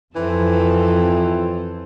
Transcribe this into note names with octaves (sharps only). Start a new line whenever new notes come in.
F2 E3 C4 A4